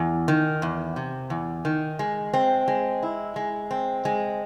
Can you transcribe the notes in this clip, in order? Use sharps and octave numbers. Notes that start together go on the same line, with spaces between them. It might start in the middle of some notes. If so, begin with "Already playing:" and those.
Already playing: E2
D#3
E2
C3
E2
D#3
G#3
C4
G#3
E4
G#3
C4
G#3